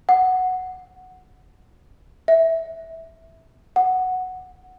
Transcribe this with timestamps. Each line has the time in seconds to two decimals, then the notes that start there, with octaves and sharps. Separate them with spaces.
0.09 F#5
2.28 E5
3.76 F#5